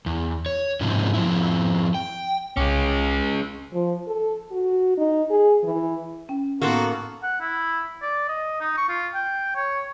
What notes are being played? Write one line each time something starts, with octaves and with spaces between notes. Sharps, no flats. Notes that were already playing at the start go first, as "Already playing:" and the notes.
E2
C#5
G#2 C3 F3 C#4 D#4
F3 C4 E4
G5
C2 G#3 C#4 G5 D6
F3
A4
F#4
D#4
G#4
E3
C#4 G5
A2 A#3 B3 D#4 F#4 A4 A#4 C6
F#5
E4
D5
D#5
D#4
C#6
F4
G5
C#5